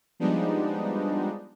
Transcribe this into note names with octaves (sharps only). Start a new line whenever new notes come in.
F3 G3 G#3 B3 D4 D#4